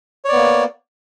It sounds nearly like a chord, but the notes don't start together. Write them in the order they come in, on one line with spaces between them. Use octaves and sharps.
C#5 D5 B3 A#3